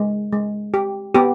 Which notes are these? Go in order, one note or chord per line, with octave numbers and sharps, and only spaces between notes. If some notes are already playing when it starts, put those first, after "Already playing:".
Already playing: G#3
G#3
G4
B3 G4